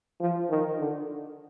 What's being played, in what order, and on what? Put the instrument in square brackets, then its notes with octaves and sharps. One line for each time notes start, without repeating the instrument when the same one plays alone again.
[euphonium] F3
D#3
D3